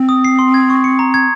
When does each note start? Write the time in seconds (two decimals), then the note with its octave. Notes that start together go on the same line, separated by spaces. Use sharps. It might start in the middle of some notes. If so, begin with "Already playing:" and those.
Already playing: C4
0.09 D#6
0.25 C7
0.39 C6
0.54 G#6
0.70 C#6
0.84 C#7
0.99 A#5
1.14 G#6